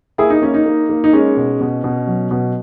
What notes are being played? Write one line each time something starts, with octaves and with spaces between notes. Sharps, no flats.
A#3 E4 G#4
D#4
A#3 C#4
D#4
A#3
A#3
D#4
G#3 C#4
B2
B2
B2
F#3
B2